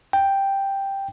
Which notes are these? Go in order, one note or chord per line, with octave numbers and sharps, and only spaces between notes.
G5